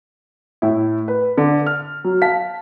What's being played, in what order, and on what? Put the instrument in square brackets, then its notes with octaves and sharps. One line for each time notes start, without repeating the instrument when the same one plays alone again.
[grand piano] A2 E4
B4
D3
F6
F#3
F5 A5 B6